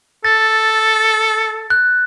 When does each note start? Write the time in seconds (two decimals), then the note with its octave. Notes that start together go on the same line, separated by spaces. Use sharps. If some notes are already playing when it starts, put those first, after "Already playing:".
0.25 A4 A6
1.70 F#6